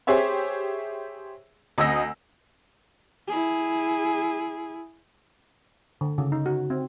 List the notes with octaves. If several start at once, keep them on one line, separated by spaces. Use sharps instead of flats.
G4 G#4 C5 C#5 E5
D2 D#5 D#6 E6 A#6
E4 G#4
D3
C#3
D#4
F#4
C4